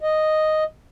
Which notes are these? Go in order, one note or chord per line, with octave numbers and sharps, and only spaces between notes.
D#5